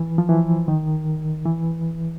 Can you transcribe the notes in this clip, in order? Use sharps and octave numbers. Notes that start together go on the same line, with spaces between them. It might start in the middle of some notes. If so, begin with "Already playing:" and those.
Already playing: E3
F3
E3
D#3
E3